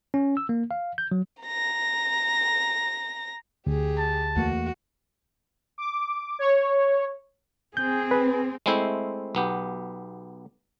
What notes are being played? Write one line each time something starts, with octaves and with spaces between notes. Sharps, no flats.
C#4
E6
A#3
F5
G6
F#3
A#5 A#6
D2 G4 G#4
A5
E2 A3 A#3 F#4
D6
C#5
C4 G#4 G6
B4
G#3 A3 C4 E4 C5
B1 B3 G4